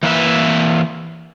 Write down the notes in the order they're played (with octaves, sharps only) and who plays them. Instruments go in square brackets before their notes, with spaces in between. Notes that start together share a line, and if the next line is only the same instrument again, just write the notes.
[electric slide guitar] E3 A#3 B4 E5